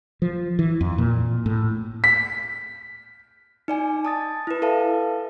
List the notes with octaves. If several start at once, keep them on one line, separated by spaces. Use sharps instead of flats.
F3
E3
F2
A#2
A2
B6
D#4 D5 G#5
A5 D#6 A6
E4 B4
A4 B4 E5 F5 A5